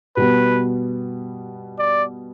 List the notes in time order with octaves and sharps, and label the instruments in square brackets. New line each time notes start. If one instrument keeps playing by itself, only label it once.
[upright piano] B2 G3 B3 [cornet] B4
[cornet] D5